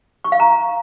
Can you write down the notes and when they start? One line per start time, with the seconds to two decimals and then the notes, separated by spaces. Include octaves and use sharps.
0.24 C#6
0.32 F5
0.40 A#5